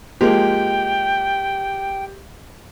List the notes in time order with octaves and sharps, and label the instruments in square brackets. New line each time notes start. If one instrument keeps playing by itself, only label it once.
[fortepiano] F3 G#3 A#3 [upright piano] G4 [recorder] G5